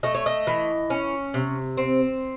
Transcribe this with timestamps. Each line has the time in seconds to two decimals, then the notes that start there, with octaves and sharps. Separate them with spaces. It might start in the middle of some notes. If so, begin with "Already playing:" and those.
0.03 A3 D#5
0.14 C#5
0.26 D#5
0.47 E3
0.90 C#4
1.34 C3
1.77 C4